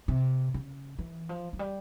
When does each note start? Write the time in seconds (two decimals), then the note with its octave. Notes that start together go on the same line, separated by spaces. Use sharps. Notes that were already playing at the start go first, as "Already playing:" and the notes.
0.08 C3
0.54 C#3
0.99 E3
1.29 F3
1.53 F3
1.59 G3